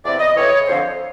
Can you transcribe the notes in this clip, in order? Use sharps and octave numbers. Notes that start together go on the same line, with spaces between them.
E2 C3 E3 D5
D#5
A2 E3 C#5
F2 D3 F3 C5